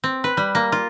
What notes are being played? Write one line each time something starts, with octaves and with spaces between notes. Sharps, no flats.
C4
B4
G3
A#3
F4